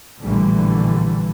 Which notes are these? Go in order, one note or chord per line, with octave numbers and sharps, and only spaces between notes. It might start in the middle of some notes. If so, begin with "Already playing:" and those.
A#1 A2 D3 E3 G3 A3